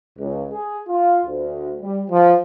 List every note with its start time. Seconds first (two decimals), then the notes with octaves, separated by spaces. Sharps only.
0.18 C#2
0.52 G#4
0.87 F4
1.26 D2
1.80 G3
2.09 F3